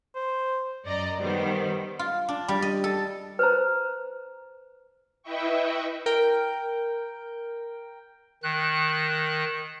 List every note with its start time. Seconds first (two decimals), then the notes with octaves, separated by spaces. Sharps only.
0.15 C5
0.87 F#2 D5 D#5 A#5
1.21 D#3 G3 B3 C5
1.99 F4
2.29 D4
2.48 G3
2.62 D#5
2.84 A4
3.39 B4 C5 A#5
5.23 E4 B4 D#5 E5 G5 C#6
6.06 A#4 G5
8.43 D#3 F#6